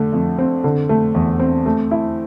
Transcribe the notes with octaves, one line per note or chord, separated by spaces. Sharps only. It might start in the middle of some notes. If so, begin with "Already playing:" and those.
Already playing: D3 A3
F2
C4
D3
A3
E2
C4
A3
E4